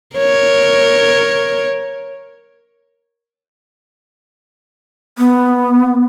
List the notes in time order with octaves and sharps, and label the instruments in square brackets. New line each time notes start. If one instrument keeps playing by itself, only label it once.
[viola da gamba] A#4 C#5
[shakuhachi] B3